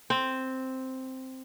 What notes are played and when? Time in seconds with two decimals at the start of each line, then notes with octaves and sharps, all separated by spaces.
0.10 C4